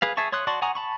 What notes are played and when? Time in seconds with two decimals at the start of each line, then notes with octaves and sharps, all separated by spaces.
0.02 G#4 B4 F5
0.17 G#4 E5 A5 C#6
0.32 C#5 C6 D#6 F#6
0.47 F#4 D5 A5 C6 C#6
0.62 F#5 G#5 A#5 C#6 D#6
0.75 A5 B5 C#6